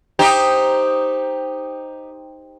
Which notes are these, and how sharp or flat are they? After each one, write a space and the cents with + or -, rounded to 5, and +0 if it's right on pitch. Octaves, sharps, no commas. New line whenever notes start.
D#4 +0 G4 +10 C5 +0